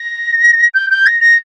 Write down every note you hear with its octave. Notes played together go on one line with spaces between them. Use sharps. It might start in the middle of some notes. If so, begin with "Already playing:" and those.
Already playing: A#6
G6
G6
A#6
A#6